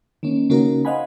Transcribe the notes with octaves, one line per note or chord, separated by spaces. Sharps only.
D#3 A#3 C#4
C#3 A#3 C#4 D#4 F#4 A#4
C5 D#5 F5 F#5 G#5 B5